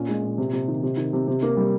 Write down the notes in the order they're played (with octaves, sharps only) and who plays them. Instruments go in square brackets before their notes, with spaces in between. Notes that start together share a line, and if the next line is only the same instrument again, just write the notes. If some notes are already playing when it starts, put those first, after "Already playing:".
Already playing: [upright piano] A#2 C#4
G#3
A#2
C3
C3
D#3
C3
D#3
C3
C3
A#3
G3